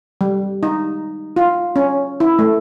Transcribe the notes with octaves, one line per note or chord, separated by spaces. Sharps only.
G3
D#4
F4
C#4
E4
A3